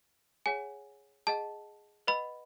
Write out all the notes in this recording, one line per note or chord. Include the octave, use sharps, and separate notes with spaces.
G#4 C#5 F#5 G#5
G#4 D#5 F#5 A5
B4 D#5 F#5 B5